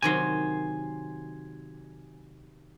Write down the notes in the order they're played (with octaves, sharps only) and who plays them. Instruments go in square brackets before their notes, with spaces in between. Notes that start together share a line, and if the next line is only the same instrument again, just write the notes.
[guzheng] C3 D#3 F#3 [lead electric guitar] G#5 C6